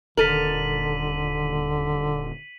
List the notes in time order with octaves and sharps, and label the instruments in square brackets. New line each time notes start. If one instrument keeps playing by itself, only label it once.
[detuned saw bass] D#1 [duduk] D3 [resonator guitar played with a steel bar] A4 A#4 [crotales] B6 D#7 F#7